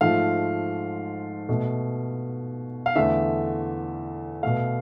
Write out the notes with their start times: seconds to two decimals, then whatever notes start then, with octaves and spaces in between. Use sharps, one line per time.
0.01 G#2 F3 A3 F5
1.49 B2 A3
2.86 F5
2.96 E2 D3 A3 E5
4.43 B2 A3 F5